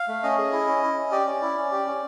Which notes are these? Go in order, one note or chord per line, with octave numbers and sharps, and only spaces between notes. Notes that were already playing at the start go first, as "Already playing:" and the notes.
Already playing: F5
A3
C#4 D#5
G#4
E4
C#4
E4
C#4
G4 D5
C#4
E4
C#4
G4
C#4